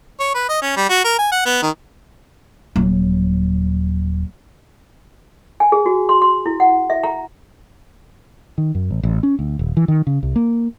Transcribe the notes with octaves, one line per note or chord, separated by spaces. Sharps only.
C#5
B4
D#5
C#4
G3
F#4
A#4
G#5
F#5
B3
D#3
D#1 F#3
G#5
G#4
F#4
C6
C6
E4
F#5
E5
A#5
D#3
F#2
A1
A1
C#4
D2
D#1
E3
D#3
C#3
C2
A#3